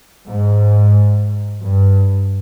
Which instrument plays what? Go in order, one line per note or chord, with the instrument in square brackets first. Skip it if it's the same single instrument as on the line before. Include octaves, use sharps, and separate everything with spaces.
[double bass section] G#2
G2